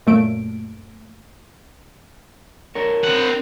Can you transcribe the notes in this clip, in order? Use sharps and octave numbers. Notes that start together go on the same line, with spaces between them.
F#2 A#2 A3 D7
D4 A#4 C#5
C4 F#5